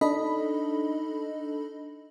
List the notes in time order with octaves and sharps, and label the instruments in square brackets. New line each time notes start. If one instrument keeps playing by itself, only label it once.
[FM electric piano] D4 D#4 A4 D#5 B5